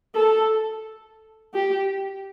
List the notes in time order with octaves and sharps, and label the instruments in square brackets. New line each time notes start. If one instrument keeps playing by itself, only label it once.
[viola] A4
G4